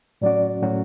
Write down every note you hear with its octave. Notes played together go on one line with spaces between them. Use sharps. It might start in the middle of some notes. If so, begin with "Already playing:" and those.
A2 F#3 C#4 F#4 D5
A2 F#3 C#4 F#4